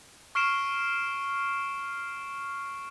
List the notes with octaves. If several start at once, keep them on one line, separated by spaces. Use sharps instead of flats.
C#6 F6 C7 D7 E7